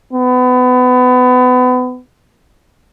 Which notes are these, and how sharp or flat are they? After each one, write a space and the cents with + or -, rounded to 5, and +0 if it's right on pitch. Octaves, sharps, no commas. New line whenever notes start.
B3 +30